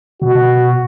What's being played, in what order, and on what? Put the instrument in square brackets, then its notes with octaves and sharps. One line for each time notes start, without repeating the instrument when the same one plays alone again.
[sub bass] B2 [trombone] F#4